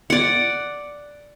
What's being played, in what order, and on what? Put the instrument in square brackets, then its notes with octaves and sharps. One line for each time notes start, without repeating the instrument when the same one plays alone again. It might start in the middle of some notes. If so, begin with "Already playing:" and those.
[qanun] D5 F#5